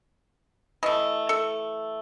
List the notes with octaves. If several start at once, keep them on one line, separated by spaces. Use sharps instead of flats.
E3 A3 D#5
A4